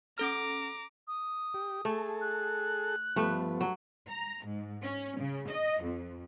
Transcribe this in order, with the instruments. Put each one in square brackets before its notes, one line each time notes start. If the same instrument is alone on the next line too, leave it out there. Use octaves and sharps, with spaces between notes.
[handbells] C#4 A4 F6 [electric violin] A#5 D6
[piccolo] D#6
[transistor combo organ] G4
[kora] A3 [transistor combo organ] G#4 A4
[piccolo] F#6
[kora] G2 A3 B4 [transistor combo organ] F3 B3
[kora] F#3
[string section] A#5
G#2
C#4
C#3
D#5
F2